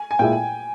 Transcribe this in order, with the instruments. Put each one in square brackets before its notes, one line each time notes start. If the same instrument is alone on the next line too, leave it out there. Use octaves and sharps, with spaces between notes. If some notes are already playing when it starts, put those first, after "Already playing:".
Already playing: [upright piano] G#5
G#5
[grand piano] A#2 G#3 E4 [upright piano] G5